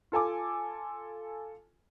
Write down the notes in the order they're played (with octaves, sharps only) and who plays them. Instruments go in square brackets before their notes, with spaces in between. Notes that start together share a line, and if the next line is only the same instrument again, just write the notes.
[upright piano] F4 A4 G#5 D6